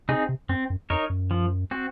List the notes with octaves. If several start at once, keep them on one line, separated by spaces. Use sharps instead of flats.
C3 C4 D#4 G#4
C3
F#2 C4
F#2
F2 D#4 A#4 C#5
F#2
F3
C4 F#4